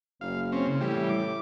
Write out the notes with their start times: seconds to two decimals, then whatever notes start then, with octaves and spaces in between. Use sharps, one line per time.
0.21 F#1 F5
0.52 C4 C#4
0.67 C#3
0.81 A2 E3 G3
1.09 D6